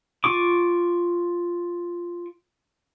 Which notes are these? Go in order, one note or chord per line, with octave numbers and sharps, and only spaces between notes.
F4 C#6 D6